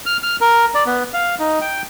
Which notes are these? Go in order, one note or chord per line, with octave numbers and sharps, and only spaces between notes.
F6
F6
A#4
D5
B3
F5
D#4
G5